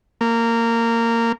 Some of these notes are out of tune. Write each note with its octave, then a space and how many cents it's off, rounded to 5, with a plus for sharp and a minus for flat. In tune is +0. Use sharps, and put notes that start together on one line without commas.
A#3 -15